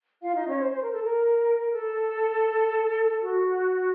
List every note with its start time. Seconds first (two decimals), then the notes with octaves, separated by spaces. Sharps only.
0.23 F4 F5
0.35 D#4 D#5
0.47 C#4 C#5
0.60 C5
0.73 C5
0.82 A#4
0.93 A4
1.04 A#4
1.72 A4
3.21 F#4